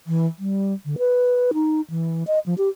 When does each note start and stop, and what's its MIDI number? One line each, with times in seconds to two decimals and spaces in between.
0.07 0.26 52
0.39 0.74 55
0.85 0.96 50
0.98 1.51 71
1.54 1.81 63
1.90 2.24 52
2.27 2.39 75
2.46 2.54 53
2.58 2.69 67